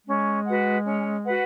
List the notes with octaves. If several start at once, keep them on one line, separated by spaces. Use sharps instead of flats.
G#3 C#4
F#4 B4 F#5
C#4
F#4 B4 F#5